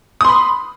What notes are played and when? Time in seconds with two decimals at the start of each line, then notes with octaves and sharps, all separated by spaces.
0.21 D#6
0.25 C6
0.29 B5